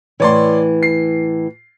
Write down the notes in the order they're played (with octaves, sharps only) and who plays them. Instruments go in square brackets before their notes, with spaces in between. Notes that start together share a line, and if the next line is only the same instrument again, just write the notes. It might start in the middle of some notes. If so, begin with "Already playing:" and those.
[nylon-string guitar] A2 E3 [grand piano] C#5 D5 C6
[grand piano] C7